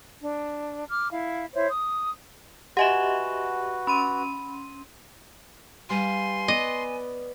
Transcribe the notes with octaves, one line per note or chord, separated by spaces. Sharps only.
D4
D6 F6
E4 F5
E4 C5 C#5 E5
D#6
F#4 G4 B4 D#5 E5 F#5 G#5 E7
C#4 B5 C6 D#7
G3 B4 F5 G#5 C6
B3 B4 D5 D#5